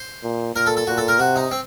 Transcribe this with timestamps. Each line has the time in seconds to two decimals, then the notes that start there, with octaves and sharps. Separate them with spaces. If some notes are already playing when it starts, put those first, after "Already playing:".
Already playing: C5
0.23 A#2
0.55 A#2 A#4
0.67 A4
0.77 A4
0.87 A#2 F#4
0.98 A4
1.08 A#4
1.19 C3 F#4
1.36 D#4
1.51 C4